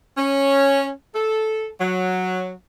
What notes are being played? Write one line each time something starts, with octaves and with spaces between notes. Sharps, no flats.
C#4
A4
F#3